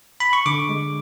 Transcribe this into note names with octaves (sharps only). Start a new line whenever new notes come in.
B5
C#6
D3 D6
G#3